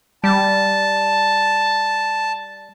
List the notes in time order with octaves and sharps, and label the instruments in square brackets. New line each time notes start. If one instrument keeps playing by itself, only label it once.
[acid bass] G3 [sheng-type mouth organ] A5